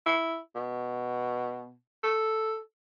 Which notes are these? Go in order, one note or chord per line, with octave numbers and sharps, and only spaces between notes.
E4
B2
A4